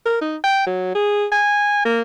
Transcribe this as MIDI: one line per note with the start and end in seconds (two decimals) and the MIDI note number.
0.06 0.19 70
0.21 0.37 63
0.44 0.64 79
0.67 0.93 54
0.95 1.27 68
1.32 1.84 80
1.85 2.01 58